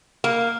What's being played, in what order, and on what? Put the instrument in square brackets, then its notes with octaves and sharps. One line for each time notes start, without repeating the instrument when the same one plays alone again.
[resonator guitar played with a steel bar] A#3